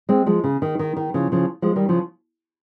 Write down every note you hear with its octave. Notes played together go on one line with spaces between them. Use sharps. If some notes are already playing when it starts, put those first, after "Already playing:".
G#3 C4
F3 G#3
C#3
D#3
D#3
D#3
C#3 F3
C#3 F3
F3 G#3
D#3 G3
C#3 F3